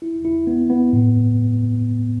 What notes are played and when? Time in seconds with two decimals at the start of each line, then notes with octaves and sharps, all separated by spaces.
0.02 E4
0.25 E4
0.47 B3
0.70 B3
0.93 A2